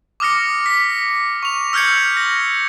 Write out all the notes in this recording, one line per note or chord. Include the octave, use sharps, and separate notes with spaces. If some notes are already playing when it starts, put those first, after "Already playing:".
D6 D#6 F6 A#6 C#7
B6
C#6 F7
E6 F6 G6 G#6 C#7
A#6